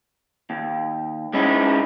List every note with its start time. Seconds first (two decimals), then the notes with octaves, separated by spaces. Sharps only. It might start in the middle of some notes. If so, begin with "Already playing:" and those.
0.50 D#2
1.33 G#3 C#4 D#4 E4